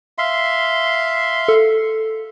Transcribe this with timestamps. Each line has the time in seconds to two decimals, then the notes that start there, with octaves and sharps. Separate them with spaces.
0.18 E5 F5 C6
1.48 A4